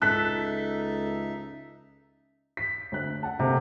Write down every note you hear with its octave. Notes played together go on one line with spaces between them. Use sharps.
C#2 D#4 A4 E5 F#6 B6
B6
D2 F#6
F#5 A5
C3 A3 A#3